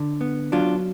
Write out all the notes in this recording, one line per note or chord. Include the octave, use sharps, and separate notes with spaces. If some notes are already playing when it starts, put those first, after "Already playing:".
Already playing: D3
B3
F#3 D4 F4